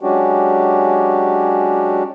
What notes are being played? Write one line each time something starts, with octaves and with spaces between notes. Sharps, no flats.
F#3 G#3 C#4 D4 F#4 G4